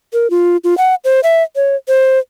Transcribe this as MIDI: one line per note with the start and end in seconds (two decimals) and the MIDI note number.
0.13 0.30 70
0.30 0.57 65
0.64 0.77 65
0.78 0.95 78
1.05 1.20 72
1.23 1.43 76
1.56 1.76 73
1.88 2.19 72